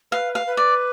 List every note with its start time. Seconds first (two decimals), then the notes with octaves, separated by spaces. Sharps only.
0.12 B4 F5
0.35 F5
0.46 B4
0.57 D5